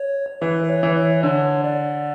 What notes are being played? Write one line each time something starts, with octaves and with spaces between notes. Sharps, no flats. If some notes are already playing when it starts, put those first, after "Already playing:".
Already playing: C#5
E3 B4
B4
C#5
E3
C#5
D3 C#5
D5